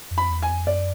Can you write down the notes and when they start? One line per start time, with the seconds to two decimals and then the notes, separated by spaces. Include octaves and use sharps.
0.11 F2
0.18 B5
0.30 E2
0.42 G#5
0.49 F2
0.67 F#2 D5